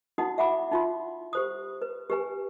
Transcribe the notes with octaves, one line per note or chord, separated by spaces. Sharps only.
D#4 E4 F#4 F#5 D#6
E5 F#5 B5 D6
D#4 F4 C6
G4 C5 D#6
B4
G4 B4 G#5